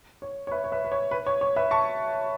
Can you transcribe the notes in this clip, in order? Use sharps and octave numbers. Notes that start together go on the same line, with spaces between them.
C#5
C#5
B4 E5
C#5
B4 E5
B4
C#5
B4
C#5
C#5
B4 E5
A5 C#6